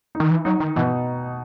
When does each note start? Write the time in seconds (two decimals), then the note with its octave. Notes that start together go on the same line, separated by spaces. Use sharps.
0.15 D#4
0.20 D#3
0.30 E3
0.45 F#3 D#4
0.60 D#3
0.76 B2 E3